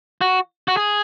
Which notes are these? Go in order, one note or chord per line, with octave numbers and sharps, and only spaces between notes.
F#4
F#4
G#4